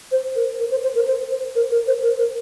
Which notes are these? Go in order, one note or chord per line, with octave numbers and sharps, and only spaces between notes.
C5
A#4
A#4
C5
C5
A#4
C5
C5
A#4
A#4
C5
A#4
A#4